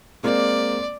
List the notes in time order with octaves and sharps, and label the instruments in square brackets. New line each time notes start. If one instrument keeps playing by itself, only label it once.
[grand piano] G#3 A#3 C4 [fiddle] D5